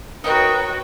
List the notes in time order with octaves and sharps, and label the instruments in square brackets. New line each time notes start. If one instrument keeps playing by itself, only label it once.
[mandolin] D#4 A#4 D#5 [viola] F#4 [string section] B4 C#5 G5